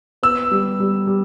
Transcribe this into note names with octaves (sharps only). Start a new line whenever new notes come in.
B3 E6
G3
G3
G3